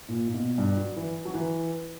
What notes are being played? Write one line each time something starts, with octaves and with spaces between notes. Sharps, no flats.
A#2
A#2
B2
G2
F#3
E3
F#3
E3